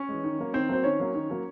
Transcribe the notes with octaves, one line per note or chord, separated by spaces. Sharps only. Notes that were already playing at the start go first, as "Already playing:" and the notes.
Already playing: C#4 C#5
E3 G#3
D#3
F#3 A#3
D#3 C4 C5
F#3 A#3 C5
D#3 C#4 C#5
F#3 A#3
D#3
F#3 A#3